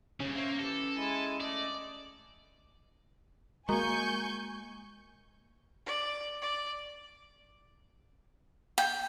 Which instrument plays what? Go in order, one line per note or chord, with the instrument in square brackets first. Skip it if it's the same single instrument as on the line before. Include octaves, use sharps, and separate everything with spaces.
[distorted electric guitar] G2 C#3 [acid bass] C#4
[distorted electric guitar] A#3 [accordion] C5 C#5 E5
[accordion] E3 G4 [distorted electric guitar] A4
[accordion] G#3 E4 G#5
[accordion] A3 D#5 [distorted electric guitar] D5
[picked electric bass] G#3 A#3 [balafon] F#4 A#4 A#5 [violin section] G#5 C#6 G6
[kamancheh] D5
D5
[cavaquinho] G5